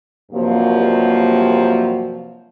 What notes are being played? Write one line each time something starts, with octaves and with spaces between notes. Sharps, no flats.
G2 C3 F3 F#3 A#3